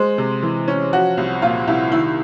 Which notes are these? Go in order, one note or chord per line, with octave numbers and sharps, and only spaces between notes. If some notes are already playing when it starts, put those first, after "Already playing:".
Already playing: G#3 C5
C3
E3
C#4
F3 F#4
C2
A#2 F4
C2 E4
D#3 E4